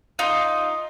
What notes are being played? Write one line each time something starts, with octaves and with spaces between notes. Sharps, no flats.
D#4 F4